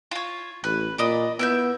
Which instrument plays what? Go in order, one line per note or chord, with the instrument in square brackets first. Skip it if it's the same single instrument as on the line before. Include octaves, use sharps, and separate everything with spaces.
[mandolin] F4 C#5
[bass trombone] A1 [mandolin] B4
[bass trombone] A#2 [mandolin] D5 D#5 B5
[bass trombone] B3 [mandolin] E4 E5 G6